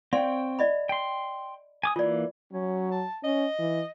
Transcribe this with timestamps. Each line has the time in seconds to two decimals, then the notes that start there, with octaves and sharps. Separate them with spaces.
0.13 C4 C#5 D5 F5 G5 C6
0.59 D5 D#5 B5
0.89 G5 C6
1.83 G#5 D6 D#6
1.96 E3 A#3 F4 D5
2.52 F#3 C#4
2.91 A5
3.24 C#4 D#5
3.59 E3